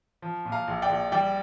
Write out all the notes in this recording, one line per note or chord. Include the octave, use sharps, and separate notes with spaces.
F3
A#2
F5 A#5
A#1
D5 G5
A#1
G3 D5 G5